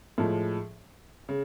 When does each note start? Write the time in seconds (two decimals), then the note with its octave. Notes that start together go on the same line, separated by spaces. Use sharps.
0.18 A2 F3 G#3
1.29 C#3